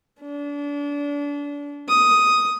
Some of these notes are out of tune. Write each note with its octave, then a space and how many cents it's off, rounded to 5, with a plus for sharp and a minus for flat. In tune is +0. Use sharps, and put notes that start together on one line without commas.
D4 -30
D#6 +5